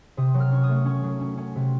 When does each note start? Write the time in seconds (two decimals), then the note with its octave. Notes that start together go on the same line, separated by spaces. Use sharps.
0.17 C3 D#6
0.34 F#3
0.40 F6
0.52 C#4 C#6
0.63 D#6
0.69 A3
0.85 C#4 C#6
1.04 F#3
1.21 C#4
1.37 C#4
1.55 C3